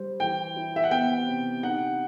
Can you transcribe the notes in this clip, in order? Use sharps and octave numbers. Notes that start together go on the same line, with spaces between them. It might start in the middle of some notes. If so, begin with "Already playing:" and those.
Already playing: G3 C5
E3 G5
E4
E5
F#5
B3 G5
C3
D#4 F#5